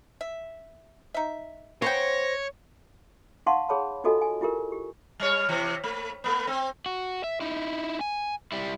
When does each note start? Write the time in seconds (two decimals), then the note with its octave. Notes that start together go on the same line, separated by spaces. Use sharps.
0.21 E5
1.14 D#4 E5
1.82 C#3 B3 C5 C#5 G5 A#6
3.46 D#4 F5 F#5 A5 C6 C#6
3.69 G#4 C#5 A5 B5
4.04 D#4 F4 F#4 A4 D#5 G#5
4.22 G#5
4.41 E4 F4 G4 A#4
4.72 G4
5.20 G3 C#5
5.49 C3 E3
5.84 A3
6.24 A3 B3
6.47 C4
6.86 F#4
7.24 E5
7.41 D#4 E4
8.01 G#5
8.52 G3 E4